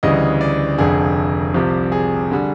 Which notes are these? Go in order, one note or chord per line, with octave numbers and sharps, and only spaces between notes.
D2 C#3 E3 G3 D#5
D5
F1 F2 D3 G#4
C2 C3 F3 G4
G#4
D3 G3